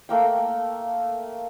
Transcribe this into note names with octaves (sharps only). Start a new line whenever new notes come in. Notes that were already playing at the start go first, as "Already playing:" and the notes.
A3 A#3 G5